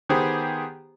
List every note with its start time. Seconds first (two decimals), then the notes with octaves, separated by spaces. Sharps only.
0.09 D#3 B3 G4 G#4 C5